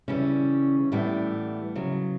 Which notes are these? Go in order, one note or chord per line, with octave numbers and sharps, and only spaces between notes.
C#3 E3 G3 C#4
A2 E3 G3 B3
C#3 F#3